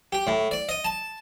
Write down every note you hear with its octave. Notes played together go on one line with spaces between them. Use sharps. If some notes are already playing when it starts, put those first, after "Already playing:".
G4
A2
D5
D#5
A5